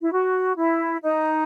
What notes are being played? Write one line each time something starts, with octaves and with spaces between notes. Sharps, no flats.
E4
F#4
E4
D#4